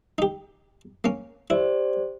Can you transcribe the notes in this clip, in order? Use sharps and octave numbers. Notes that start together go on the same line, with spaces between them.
D#4 G4
A#3 C#4
E4 G4 C5 D5